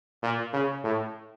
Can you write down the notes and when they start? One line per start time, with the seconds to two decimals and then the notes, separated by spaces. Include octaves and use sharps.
0.23 A#2
0.53 C#3
0.84 A2